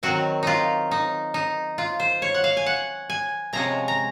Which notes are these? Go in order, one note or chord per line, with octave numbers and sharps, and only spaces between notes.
D#3 F#3 C4 F#4
D#4 F4
D#4
D#4
F4
C5
C#5
F#5
F5
G#5
F#5
G#5
C3 F3 G#3 C#4 A#5
A#5